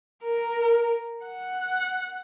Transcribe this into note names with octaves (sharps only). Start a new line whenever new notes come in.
A#4
F#5